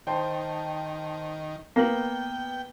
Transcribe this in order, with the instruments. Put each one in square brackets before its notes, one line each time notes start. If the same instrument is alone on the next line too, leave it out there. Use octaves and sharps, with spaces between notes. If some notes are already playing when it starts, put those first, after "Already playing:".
[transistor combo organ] D#3 [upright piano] C5 G5 A5
[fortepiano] A#3 [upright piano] B3 F#7 [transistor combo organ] G5